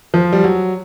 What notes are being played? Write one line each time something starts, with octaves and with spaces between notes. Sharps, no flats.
F3
G3
F#3